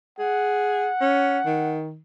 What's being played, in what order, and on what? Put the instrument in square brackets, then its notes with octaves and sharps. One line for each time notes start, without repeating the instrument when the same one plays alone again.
[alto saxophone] G#4 [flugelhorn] F#5
[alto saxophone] C#4
D#3